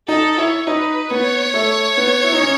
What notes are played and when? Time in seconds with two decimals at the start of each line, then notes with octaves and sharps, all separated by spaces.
0.08 D#4 A4
0.38 E4 C#5
0.67 D#4 B4
1.10 B3 C#5
1.54 A3
1.97 B3
2.24 E4
2.32 D#4
2.41 C#4